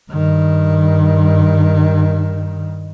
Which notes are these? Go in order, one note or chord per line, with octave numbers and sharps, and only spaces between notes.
G2 D#3